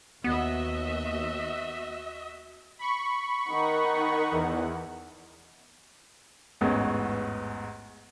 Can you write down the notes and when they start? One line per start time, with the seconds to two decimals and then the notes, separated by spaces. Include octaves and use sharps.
0.24 D#2 B3 F#4 D#5 E5
2.79 B5 C#6
3.50 D#3 D#4 F#5
4.31 E2
6.61 A1 E2 G#2 B3 C#4